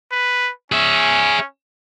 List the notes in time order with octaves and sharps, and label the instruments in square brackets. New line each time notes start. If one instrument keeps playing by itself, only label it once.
[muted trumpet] B4
[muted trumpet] C#4 [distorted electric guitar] G#4 E5